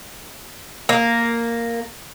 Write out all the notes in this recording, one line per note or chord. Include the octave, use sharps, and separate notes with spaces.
A#3